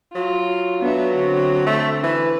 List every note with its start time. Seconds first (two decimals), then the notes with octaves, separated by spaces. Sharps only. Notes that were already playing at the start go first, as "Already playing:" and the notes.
0.15 F#3 F4
0.81 B3 D4 E5
1.16 D3 C4
1.66 A3
2.04 E3 B4